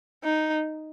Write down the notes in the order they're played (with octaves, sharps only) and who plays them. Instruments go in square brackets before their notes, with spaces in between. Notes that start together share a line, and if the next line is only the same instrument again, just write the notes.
[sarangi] D#4